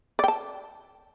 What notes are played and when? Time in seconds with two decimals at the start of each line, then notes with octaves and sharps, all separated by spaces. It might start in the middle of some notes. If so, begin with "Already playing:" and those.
0.19 D5
0.24 G5
0.28 A5